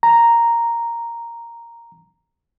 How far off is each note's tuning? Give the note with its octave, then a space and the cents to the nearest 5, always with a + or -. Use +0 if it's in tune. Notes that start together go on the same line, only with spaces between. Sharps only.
A#5 +0